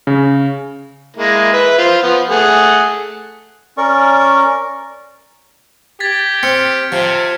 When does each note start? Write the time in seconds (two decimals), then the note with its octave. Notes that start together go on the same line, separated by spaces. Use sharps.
0.07 C#3
1.17 G#3 A#3 E4
1.53 B4 E5
1.78 F4 C5
2.03 F3 B3
2.30 A3 G#4 F#5
3.78 C#4 A#4 D5 C#6
6.00 G4 G#6 A6 B6
6.43 C4 F6 C#7
6.92 C3 F3